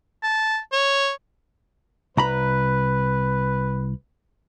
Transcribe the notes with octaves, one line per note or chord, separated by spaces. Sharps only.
A5
C#5
C2 B4 A#5 B5